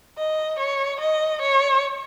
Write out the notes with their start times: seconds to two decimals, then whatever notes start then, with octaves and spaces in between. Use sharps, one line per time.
0.18 D#5
0.60 C#5
1.01 D#5
1.42 C#5